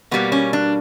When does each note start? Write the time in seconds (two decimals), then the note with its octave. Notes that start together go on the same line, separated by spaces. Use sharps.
0.11 B2 G3 A#3 B3
0.32 C#4
0.53 D4